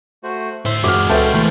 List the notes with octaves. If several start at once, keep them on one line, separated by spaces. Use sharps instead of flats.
A3 F#4 C5
D2 A2 C5 E5
F#2 G#3 F#4 G#4 D6 F6
C#2 C#4 A4 B4 C5 E5 G5
E3 G#3 A3